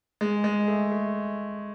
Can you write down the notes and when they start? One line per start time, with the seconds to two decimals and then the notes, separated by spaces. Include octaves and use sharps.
0.21 G#3
0.44 G#3
0.68 A3
0.92 A3